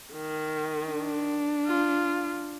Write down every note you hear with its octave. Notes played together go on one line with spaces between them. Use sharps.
D#3
D4
F4